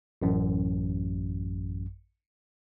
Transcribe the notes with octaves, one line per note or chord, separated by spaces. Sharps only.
A1 F#2